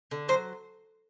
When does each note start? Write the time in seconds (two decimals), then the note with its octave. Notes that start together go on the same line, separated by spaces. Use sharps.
0.11 D3
0.29 F#3 C5